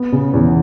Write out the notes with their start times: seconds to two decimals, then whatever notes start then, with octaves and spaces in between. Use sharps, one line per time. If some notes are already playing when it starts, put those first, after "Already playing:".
Already playing: B3
0.12 C#3
0.34 E2